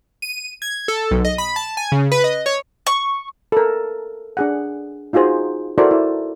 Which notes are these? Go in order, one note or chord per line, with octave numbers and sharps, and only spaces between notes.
D#7
G#6
A4
B1
D#5
B5
A5
G#5
C#3
B4
D#5
C#5
C#6
A4 A#4
D4 G#4 F#5
D#4 F4 F#4 G#4 C5
E4 F#4 A4 A#4 C5 D5
E4